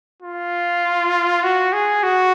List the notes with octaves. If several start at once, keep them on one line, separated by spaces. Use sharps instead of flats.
F4
F#4
G#4
F#4